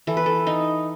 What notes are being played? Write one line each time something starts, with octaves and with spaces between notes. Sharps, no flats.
E3 A4
B4
A4
D#4